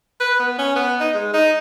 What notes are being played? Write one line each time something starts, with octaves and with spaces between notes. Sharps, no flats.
B4
B3
C#4
B3
D#4
G#3
D#4